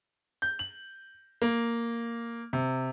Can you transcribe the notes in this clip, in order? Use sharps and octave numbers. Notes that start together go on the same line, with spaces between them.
G6
F#7
A#3
C3